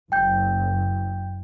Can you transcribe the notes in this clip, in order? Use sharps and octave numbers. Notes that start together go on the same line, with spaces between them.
F#1 F#2 G5 G6